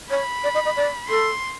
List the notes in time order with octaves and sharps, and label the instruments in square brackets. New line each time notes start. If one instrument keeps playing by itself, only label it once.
[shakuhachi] C#5 [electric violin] B5
[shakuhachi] D5
D#5
D#5
D5
[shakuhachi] A4 [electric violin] C6